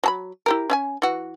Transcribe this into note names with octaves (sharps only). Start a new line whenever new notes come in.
F#3 A5 B5
E4 G4 A#4
C#4 E5 G#5
E3 F#4